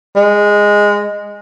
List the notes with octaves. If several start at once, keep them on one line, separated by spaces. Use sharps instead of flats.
G#3